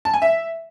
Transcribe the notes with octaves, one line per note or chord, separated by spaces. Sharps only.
A5
G#5
E5